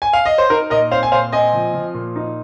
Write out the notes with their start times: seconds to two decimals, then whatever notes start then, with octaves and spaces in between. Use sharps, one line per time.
0.02 G#5
0.13 F5
0.25 D#5
0.38 C5
0.50 D#4 A#4
0.70 A#2 A#4 D#5
0.91 C4 C5 F5
1.03 G#5
1.12 A#2 C5 F5
1.32 C4 D#5 G#5
1.53 F3
1.74 F3
1.94 A#2
2.16 D#4